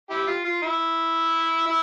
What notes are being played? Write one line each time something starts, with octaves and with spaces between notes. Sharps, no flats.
E4 G4
F4
F4
E4
E4